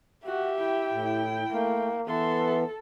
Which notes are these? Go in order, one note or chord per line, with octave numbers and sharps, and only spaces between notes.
F#4 G4 E5
E4 G5
A2
A3 A#3
E3 B3 A4 E5 C6